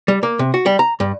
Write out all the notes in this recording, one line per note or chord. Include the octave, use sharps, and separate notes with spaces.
G3
A#3
C3
F#4
G3
A#5
G2